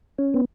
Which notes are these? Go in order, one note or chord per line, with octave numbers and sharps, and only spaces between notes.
C#4
B3